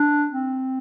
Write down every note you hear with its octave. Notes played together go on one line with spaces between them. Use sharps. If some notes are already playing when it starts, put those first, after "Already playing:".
Already playing: D4
C4